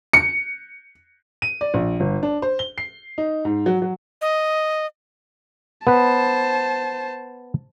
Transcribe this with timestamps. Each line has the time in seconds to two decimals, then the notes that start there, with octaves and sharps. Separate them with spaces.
0.13 C#7
1.42 D#7
1.61 D5
1.74 A#1
2.00 G1
2.23 D4
2.42 C5
2.59 G7
2.78 C7
3.18 D#4
3.45 G#2
3.66 F#3
3.82 F#3
4.21 D#5
5.87 B3 B4 C5 A5